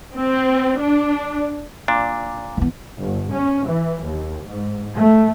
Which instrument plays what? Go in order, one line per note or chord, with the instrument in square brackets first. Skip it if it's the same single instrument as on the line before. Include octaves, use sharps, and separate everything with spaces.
[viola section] C4
D4
[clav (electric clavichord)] A#2 D4
[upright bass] E3 B3
[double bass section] G1
C#4
E3
D#2
G#2
A3